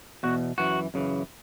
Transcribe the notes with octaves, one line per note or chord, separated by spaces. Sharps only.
E2 B2 F#4
F#2 E3 F#4
F#2 C#3 E3